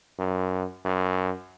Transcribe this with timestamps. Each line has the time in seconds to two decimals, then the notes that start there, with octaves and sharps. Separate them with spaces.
0.19 F#2
0.85 F#2